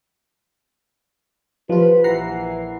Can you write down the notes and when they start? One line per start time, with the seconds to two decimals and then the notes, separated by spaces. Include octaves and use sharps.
1.70 F3 F4 G4 B4
2.04 A#1 E3 F#5 A#5 C7